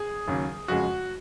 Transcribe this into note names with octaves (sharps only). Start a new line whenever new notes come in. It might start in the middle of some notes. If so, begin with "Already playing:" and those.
Already playing: G#4
D#2 C#3 F#3
F2 C#3 G#3 F#4